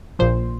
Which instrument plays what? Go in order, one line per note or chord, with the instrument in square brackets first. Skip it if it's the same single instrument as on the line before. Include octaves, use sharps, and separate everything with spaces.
[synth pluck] A#1 A#2 F3 C5